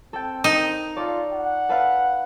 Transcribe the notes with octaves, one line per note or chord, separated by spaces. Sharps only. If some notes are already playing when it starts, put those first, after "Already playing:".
C4 A4 G5
D#4 A#4 G5
F4 A4 D5 C#6
F#5
A4 B4 F5